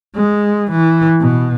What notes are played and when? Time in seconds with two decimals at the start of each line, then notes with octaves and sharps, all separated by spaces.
0.15 G#3
0.71 E3
1.21 B2